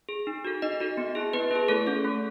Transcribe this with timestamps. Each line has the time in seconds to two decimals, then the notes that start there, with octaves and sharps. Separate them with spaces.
0.09 G#4
0.27 D#4
0.45 F#4 A4
0.62 D#4 D#5
0.80 F#4 A4
0.97 B3
1.15 E4 G#4
1.33 B3 B4
1.51 E4 G#4
1.68 A3 A4
1.86 C#4 G#4
2.05 A3